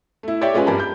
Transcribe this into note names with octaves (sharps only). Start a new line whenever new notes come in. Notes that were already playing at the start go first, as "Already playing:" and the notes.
A3 E4
G4 C#5 D5 E5 G5
G#3 C#4 F4 B4 G#5
G2 G3 A#4 G#5 A5 B5
G6